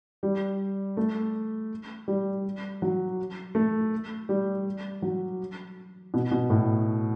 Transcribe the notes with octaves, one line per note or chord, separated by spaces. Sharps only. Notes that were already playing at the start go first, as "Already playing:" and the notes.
G3
A3
G3
F#3
A3
G3
F#3
B2
B2
A2